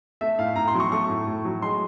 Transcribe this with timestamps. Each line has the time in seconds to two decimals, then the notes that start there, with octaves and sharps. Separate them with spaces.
0.21 A3 E5
0.38 A2 F5
0.56 A2 A#5
0.68 C6
0.74 F#3
0.80 C#6
0.92 A3 C#6
1.09 A2
1.27 A2
1.45 F#3
1.62 G#3 C6